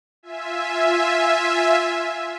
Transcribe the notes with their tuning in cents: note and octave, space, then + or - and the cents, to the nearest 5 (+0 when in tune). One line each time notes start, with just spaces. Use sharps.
F4 +0 E5 +0 G#5 +0